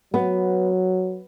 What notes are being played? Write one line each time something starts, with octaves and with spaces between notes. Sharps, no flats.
F#3 B3